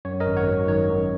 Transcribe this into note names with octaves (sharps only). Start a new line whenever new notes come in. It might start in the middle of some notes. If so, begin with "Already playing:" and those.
F#2 C#5
A#4 D#5
G#1
C#5 F#5
F#3
D#3 C#5
F#2